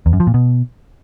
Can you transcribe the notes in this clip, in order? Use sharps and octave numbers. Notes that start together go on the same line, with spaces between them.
E2
F#2
F3
A#2
B2